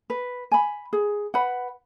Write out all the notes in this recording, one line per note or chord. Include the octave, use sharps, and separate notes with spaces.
B4
G#5 B5
G#4
B4 F#5 B5